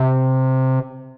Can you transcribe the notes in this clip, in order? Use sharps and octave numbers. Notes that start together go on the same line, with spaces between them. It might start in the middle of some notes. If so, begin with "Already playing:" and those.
Already playing: C3